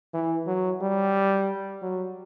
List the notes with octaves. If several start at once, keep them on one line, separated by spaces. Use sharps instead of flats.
E3
F#3
G3
F#3